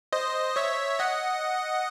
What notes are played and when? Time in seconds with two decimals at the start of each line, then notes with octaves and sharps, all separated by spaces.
0.12 C5 D#5
0.56 C#5 E5
0.99 D#5 F#5